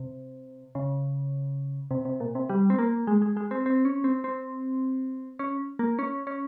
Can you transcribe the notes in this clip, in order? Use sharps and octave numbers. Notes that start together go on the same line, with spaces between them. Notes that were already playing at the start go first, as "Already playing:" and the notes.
Already playing: C3
C#3
C3
C3
A#2
C3
G3
C4
A#3
G#3
G#3
G#3
C4
C4
C#4
C4
C4
C#4
A#3
C#4
C#4